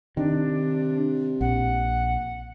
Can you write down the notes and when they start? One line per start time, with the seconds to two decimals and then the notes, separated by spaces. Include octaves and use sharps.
0.17 C3 D#3 D4
1.41 A#1 F#5